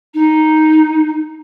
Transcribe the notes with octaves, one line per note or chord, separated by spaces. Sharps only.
D#4